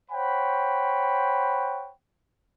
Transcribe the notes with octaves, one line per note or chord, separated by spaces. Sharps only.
C5 C#5 F#5 G5 B5